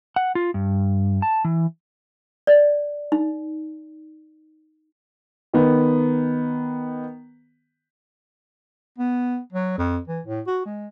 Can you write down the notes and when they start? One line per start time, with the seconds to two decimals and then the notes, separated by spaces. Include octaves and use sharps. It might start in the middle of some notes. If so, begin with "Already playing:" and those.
0.16 F#5
0.35 F4
0.54 G2
1.22 A5
1.45 E3
2.47 D5
3.12 D#4
5.54 D#3 B3
8.98 B3
9.52 F#3
9.78 F2
10.08 E3
10.26 A2
10.47 F#4
10.66 G#3